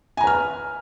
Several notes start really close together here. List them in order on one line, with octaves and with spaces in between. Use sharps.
G#5 A#5 B4 F6